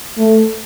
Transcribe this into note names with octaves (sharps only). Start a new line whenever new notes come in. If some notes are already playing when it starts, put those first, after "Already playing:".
A3